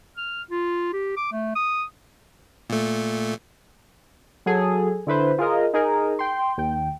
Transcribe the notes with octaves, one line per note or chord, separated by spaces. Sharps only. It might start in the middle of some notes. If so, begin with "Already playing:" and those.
F6
F4
G4
D6
A3
D#6
A#2 A3
F#3 G#4 A4
D3 E4 B4 C5
F4 G#4 A#4 D#5
D#4 G#4 A#4
G5 C6
D#2 G5